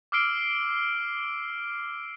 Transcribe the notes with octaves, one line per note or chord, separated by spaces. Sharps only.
D6 E6 F6 C7 D7 G7